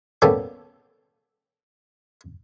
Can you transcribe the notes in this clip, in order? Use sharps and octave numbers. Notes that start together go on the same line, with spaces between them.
G3 A#3 B3 C#4 G4 A4